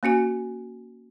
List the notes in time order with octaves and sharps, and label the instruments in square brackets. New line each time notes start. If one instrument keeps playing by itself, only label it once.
[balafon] A#3 C#4 F#4 G#5